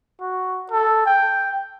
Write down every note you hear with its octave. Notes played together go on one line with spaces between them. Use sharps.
F#4
A4
G5